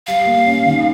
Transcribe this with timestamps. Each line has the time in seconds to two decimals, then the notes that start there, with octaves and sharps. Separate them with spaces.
0.07 G3 F5
0.26 A#3
0.46 C#4
0.66 D#3